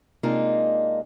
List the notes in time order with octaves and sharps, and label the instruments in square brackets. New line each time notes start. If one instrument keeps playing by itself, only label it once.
[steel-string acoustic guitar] C3 G#3 A#3 D4 D#4 F4